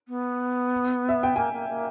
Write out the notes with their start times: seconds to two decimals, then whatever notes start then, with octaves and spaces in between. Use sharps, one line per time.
0.08 B3
1.09 E5
1.23 G5
1.36 A#3 G#5
1.53 A#3
1.69 A#3